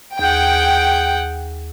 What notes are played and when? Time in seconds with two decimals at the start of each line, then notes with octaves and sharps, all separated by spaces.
0.19 D#2 G#4 F#5 G5 G6